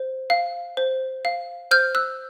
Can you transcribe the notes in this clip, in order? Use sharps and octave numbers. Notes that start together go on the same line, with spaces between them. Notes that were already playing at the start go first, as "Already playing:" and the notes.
Already playing: C5
F5
C5
F5
C5 F6 G6
E6 F#6